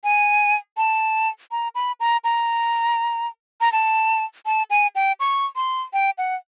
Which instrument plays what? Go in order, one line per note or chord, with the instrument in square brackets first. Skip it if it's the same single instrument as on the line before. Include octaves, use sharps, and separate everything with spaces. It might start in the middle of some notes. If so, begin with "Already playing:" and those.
[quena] G#5
A5
A#5
B5
A#5
A#5
A#5
A5
A5
G#5
G5
C#6
C6
G5
F#5